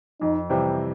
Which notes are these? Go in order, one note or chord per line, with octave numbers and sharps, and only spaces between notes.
F2 D#4
C3 E3 G3 C4